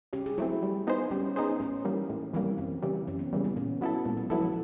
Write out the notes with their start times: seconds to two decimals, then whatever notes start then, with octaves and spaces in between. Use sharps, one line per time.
0.13 C#3 G4
0.26 G#4
0.38 F#3 A3 C4 E4
0.63 G3
0.87 B3 D#4 G#4 C5
1.11 G3 C#4
1.36 B3 D#4 G#4 C5
1.60 A2 C#4
1.84 E3 G3 A#3
2.10 A2 C#4
2.34 E3 G3 A#3 C4
2.58 F#2 C4
2.82 C#3 E3 G3
3.07 F#2 C#4
3.19 B3
3.32 C#3 E3 G3 A#3
3.44 B3
3.56 A#2 C#4
3.81 F#3 B3 E4 A4
4.05 A#2 G#3
4.17 F#3
4.30 F3 F#3 B3 E4 A4
4.42 E3